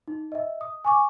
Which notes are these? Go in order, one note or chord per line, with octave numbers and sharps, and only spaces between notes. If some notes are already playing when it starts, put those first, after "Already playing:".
D#4
D#5 E5
D#6
G#5 C#6 D6